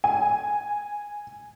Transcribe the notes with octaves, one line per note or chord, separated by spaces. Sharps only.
G#5